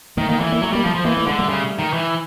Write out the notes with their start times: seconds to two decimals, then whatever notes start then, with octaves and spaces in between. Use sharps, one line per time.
0.17 D#3 A3
0.29 D#3 A#3
0.40 E3 A3
0.52 A#3
0.62 F#3 A3
0.73 G3 A#3
0.84 F3 G3 A3
0.95 F3
1.05 E3 A#3
1.17 A3
1.26 D3 G#3
1.39 G3 A3
1.49 C#3
1.79 D#3
1.93 E3